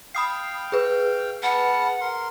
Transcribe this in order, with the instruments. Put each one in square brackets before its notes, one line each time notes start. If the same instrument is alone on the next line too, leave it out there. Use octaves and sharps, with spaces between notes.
[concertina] F5 G5 [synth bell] B5 D#6 C7
[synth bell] G#4 B4
[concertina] B3 A5 F6 [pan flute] F#5
[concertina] A#4 C6